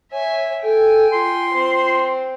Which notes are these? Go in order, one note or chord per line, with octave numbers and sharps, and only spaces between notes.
C#5 E5 G#5
A4 G5 G#5
F4 C6
C4 C5